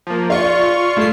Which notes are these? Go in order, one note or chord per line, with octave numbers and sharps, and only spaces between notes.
F3 A#3
F4 D5 C#6
A3 E4 F4 C7